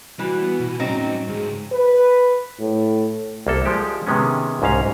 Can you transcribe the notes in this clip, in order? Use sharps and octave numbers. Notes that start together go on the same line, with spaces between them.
E3 G3 F#4
B3
B2
A2 F#3 G3 C4 C#4 D#4
C#2 G#2 G#4
B4
A2
C2 A#3 A4
F3 G#3 G4
C3 D#3 G#3 B3 C#4
C2 G#2 C#4 F5 A#5